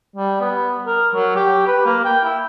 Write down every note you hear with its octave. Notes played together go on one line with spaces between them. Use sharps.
G3
B3
A#4
F#3
G4
B4
A#3
G5
E4